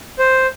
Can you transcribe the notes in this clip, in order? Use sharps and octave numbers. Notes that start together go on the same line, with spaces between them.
C5